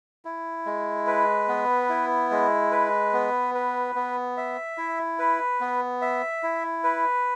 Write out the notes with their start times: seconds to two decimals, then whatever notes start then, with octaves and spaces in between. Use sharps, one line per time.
0.25 E4
0.66 G#3
1.07 B4
1.48 B3
1.89 E4
2.31 G#3
2.72 B4
3.13 B3
3.55 B4
3.95 B3
4.37 E5
4.78 E4
5.19 B4
5.60 B3
6.02 E5
6.43 E4
6.84 B4